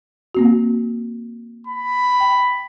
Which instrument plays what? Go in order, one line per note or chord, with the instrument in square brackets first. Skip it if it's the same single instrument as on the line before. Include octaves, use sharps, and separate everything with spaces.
[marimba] A#3 C4 F#4
[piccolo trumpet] B5
[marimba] G5